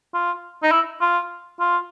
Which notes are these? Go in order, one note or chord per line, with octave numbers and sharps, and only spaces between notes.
F4
D#4
E4
F4
F4